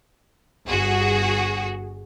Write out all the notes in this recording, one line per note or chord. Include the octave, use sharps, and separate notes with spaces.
G1 F#4 G#4